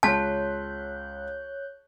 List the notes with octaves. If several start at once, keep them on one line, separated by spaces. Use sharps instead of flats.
C#2 C#5 A5 C6 F#6 G6 B6